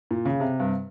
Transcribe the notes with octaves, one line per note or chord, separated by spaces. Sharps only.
A#2
C#3
C3
G2